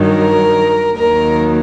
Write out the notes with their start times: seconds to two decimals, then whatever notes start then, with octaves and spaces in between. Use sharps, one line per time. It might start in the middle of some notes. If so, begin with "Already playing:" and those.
Already playing: G2 D#3 F#3
0.09 A#4
0.96 D#2 D#3 F#3 A#4